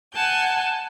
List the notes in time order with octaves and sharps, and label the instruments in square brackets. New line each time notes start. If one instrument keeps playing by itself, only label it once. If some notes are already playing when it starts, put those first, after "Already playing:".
[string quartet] F#5 G#5 A5 G6